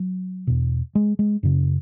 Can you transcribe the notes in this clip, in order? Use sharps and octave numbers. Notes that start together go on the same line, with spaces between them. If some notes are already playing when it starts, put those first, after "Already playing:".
Already playing: F#3
E2 B2
G#3
G#3
F#2 C#3